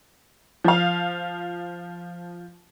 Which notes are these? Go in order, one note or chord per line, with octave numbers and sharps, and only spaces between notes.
F3 F5